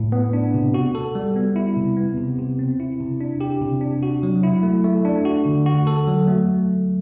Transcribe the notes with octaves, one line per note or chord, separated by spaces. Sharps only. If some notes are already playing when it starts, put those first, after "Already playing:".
Already playing: A2
B3
D4
C3
F#4
A4
G3
B3
E4
C3
B3
C3
C3
C4
E4
C3
D4
G4
C3
D4
F#4
F#3
E4
A3
A3
D4
F#4
D3
F#4
A4
F#3
A3